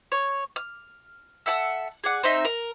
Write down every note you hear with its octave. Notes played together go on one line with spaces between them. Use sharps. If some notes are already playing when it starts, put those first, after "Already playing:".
C#5
F6
A4 E5 F#5 A5
G#4 D5 F#5
C4 D#4 E5
A#4